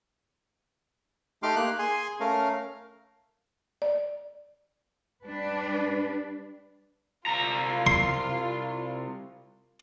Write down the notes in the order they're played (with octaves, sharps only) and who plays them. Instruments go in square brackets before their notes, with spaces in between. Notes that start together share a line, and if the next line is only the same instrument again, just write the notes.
[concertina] A3 D#4 G4 C6 D6 F6
A#3 F#6
G#4 G#5 C6
A3 C#4 A#4 F5
[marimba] D5
[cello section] G3 D4 B4
[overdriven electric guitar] C2 A#5 [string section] F4
[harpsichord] C6